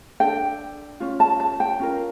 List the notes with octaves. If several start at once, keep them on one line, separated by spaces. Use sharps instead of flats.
D4 A4 G5
C#4 F4
A5
A5
G5
C#4 F4 A#4